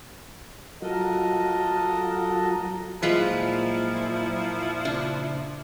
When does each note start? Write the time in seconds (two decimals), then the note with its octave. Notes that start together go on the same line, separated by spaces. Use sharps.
0.82 F#3 F4 F#4 A4 A#4 D#5
3.03 A#2 F3 F#3 G#3 E4 F4 B4
4.85 C#3 D4